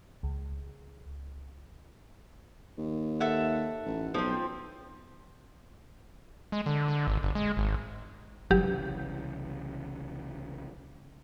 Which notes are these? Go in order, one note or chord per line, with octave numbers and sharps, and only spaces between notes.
C#2
D#2
A4 E5 F#5
A1
B1 F3 C4
G#3
D3
D3
G#1
G1
G#3
G#1
G1 C2 C#3 E3 F#3 G4